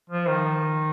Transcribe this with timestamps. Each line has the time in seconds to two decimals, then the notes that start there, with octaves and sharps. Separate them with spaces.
0.10 F3
0.29 D#3